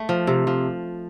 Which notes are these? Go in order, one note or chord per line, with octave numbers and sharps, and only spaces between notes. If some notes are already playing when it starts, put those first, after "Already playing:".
Already playing: A3
F3
C3
F3